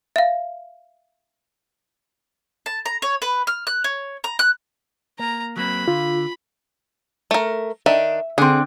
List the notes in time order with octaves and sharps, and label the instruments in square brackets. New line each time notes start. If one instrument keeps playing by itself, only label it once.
[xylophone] E5 F5
[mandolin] A5
A#5
C#5
B4
F6
F#6
C#5
A#5
F#6
[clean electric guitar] A#3 [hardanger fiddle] A#5
[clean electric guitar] F#3 A#3 C4 [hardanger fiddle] B5
[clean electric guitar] D3 [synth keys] F4
[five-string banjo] A3 A#4
[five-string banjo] D#3 D4 [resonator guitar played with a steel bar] E5
[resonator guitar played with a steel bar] D3 C4 [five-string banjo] G#4